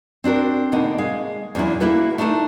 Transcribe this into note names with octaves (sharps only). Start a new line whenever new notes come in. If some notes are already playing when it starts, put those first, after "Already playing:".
C4 D4 F#4 A#4
E2 B2 D3 A#3 D#4 F#5
G#3 F5
E2 A#2 F#3 C#4 D4 E4
D3 A#3 E4 F#4 A4 B4
A3 D4 D#4 A4 A5